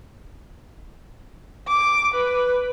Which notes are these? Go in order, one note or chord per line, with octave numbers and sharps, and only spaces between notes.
D6
B4